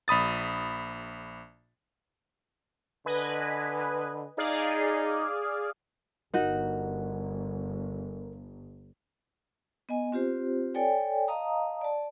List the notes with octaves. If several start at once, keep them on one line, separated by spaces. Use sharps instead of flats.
A#1 B5 D#6 A6
D3 B4 D#5 G#5
D#4 G#4 D5 F5
G1 D#4 F#4 A#4
B3 D#5 G#5
C4 F4 G4 C5
A4 C#5 D5 G5 G#5
D#5 F5 A5 A#5 D#6
D5 A5